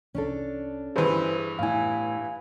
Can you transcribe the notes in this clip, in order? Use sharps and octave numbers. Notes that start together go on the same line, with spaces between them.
C2 C#4 D4 A4
G2 E3 G#4 B4 C5
A2 E4 F5 G#5